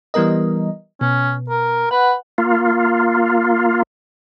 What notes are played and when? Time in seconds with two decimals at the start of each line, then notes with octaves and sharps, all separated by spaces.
0.14 E3 G3 B3 A#4 D#5
1.01 B2 C#4
1.49 A#4
1.91 B4 F#5
2.38 A#3 F4